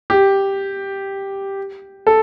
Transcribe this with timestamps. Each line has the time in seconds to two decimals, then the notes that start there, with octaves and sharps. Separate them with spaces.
0.10 G4
2.07 A4